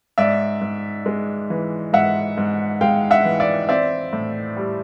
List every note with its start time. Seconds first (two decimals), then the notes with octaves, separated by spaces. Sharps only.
0.18 G#2 D5 E5
0.61 G#2
1.06 G#3
1.50 E3
1.93 G#2 E5 F#5
2.37 G#2
2.81 G#3 F5 G5
3.11 E5 F#5
3.25 E3
3.40 D5 E5
3.69 C4 D5 E5
4.13 A2
4.57 G3